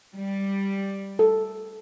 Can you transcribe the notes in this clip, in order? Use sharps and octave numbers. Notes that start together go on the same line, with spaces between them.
G3
A4